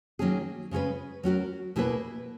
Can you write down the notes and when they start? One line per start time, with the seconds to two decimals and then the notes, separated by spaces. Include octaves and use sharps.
0.19 D#3 F#3 A#3 C#4 G#4
0.71 C#3 G#3 C#4 G#4 B4
1.23 F#3 C#4 F#4 A#4
1.76 B2 A#3 E4 G#4 B4